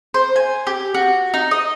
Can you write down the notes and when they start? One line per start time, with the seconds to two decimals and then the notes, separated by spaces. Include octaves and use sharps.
0.14 C5
0.36 G#5
0.67 G4
0.94 F#4
1.34 D#4
1.51 D#5